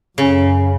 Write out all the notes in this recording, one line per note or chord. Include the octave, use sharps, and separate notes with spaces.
F#2 C#3